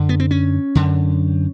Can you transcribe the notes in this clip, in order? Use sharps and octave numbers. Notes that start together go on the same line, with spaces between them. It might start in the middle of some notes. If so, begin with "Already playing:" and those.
Already playing: F#2 D3
B3
C4
C#4
F#2 D3